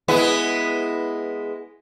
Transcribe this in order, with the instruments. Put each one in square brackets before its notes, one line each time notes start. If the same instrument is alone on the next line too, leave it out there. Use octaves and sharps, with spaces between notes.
[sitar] G#3 B3 E4